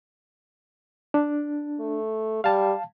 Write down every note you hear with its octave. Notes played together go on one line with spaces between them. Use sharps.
D4
A3
G3 F5 A5